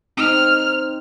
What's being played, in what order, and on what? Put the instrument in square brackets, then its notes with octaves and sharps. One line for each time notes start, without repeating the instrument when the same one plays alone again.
[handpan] C4 D#4 [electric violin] F6